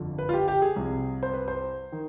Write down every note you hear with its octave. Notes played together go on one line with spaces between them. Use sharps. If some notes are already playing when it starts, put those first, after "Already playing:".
Already playing: G1 F2 D3 F3
B4
F4
G4
G4
G#4
C2 C3 F3
C5
B4
C5
D#3